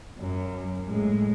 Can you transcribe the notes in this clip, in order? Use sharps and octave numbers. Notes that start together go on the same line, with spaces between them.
F#2
A2 G#3